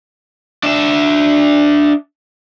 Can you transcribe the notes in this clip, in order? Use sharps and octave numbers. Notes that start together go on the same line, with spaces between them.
D4 E5